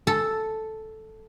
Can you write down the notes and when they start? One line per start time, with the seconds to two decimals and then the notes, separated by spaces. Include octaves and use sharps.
0.07 A4